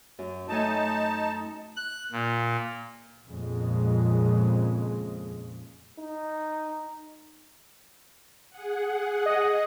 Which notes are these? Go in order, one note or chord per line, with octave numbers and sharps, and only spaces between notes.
F#2
F#2 A3 D#4 G#5 A5
F#6
A#2
F2 A#2 C#3 G#3
D#4
G#4 F#5
D#5